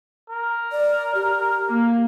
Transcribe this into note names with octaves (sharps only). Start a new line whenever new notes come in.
A#4
D5
G4
A#3